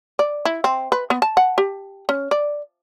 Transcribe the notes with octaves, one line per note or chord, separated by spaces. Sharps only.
D5
E4
C4
B4
B3
A5
F#5
G4
C#4
D5